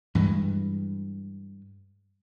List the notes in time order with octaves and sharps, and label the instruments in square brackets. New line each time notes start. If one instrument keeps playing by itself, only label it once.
[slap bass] G2 E3 G#3